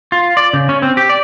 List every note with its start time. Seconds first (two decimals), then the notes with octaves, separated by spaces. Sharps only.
0.12 F4
0.37 D5
0.53 C#3
0.69 C#4
0.82 C4
0.97 G4
1.09 D5